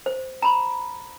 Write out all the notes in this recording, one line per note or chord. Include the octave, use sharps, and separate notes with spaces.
C5
A#5 B5